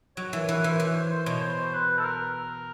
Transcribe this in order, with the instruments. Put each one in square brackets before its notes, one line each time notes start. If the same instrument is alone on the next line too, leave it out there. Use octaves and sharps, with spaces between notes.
[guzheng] F#3 [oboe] C#5
[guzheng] E3
[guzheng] E3 [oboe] B4
[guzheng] E3 [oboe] C5
[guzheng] E3 [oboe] C#5
[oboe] C5
C5
[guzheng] B2 [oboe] C#5
[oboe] C5
B4
A4
A#4